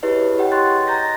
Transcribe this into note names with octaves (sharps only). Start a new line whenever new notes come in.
E4 G4 G#4 B4 C#5 D#5
G4 C#5 D#5 F#5 G5
D#5 C6 C#6 F#6 A6
D#5 A#5 G6 A6 A#6